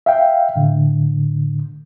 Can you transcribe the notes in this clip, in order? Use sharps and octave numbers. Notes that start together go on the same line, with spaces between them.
E5 F5 G5
A2 D3